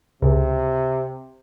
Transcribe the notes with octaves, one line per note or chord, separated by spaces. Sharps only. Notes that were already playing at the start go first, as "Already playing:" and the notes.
C#2 C3